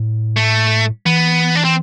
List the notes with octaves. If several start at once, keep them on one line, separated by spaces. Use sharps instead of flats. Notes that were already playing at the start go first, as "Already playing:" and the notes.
Already playing: A2
A3
E3 B3
D4
C4